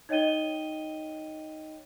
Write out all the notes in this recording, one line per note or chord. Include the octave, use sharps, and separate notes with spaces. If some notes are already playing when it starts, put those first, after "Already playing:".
D#4 C#5 D#5 G5 D#7 G7